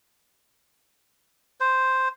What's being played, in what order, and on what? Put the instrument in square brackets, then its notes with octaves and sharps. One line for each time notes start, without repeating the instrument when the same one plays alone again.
[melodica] C5